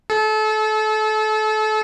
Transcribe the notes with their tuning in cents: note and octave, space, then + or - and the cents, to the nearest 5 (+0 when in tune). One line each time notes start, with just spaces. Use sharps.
A4 -30